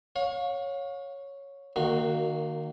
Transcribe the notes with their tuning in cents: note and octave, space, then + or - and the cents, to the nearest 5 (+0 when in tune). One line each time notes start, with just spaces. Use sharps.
C#5 +0 F5 +40
D#3 -35 A#3 -10 F#4 +0